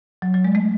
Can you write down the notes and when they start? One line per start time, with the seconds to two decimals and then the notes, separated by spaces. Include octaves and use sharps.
0.22 F#3
0.34 F#3
0.44 G#3
0.55 A3